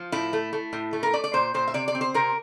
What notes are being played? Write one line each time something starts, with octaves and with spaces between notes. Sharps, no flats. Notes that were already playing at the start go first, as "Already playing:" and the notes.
Already playing: F3
A2 E4
A3
A3
A2
A3
A#4
A3 D5
D5
A#2 C5
A#2 C5
E5
C3 D5
D5
C4
C5
C3 A#4